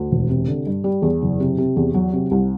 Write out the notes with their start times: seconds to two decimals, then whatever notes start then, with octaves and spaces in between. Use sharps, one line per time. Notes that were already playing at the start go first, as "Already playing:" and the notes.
Already playing: D2
0.12 E1
0.29 C3
0.48 D3
0.67 G2
0.84 G3
1.02 E2
1.22 F#1
1.40 C3
1.58 C3
1.76 E2
1.94 F#3
2.13 C3
2.31 C2